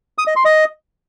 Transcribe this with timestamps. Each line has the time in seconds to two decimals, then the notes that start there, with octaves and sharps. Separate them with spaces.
0.18 D#6
0.27 D#5
0.36 C6
0.45 D#5